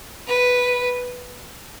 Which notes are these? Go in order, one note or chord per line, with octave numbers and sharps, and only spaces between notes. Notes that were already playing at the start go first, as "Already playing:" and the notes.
B4